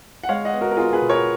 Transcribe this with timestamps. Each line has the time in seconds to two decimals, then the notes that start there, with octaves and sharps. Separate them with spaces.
0.24 F#5
0.29 G#3 C#5 F5
0.45 D#5 F#5
0.53 B3
0.61 F#4 A#4
0.71 A#4
0.77 B3 F4 G#4
0.93 G#4 B4
1.01 B2
1.09 A#4 C#5